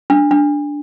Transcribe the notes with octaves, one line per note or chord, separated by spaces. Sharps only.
D4
D4